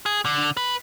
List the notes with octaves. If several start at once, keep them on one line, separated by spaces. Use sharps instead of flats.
G#4
D3
B4